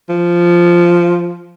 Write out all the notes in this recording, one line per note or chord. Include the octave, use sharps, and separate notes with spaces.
F3